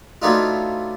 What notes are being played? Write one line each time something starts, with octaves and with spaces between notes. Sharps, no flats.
F#3 A3 B3 D4 D#4 F4